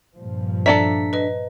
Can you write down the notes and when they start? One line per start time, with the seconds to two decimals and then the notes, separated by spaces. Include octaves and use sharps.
0.17 G2 A#2 F3
0.66 D4 A4 D5 E5 A#5 B6
1.13 B4 D#5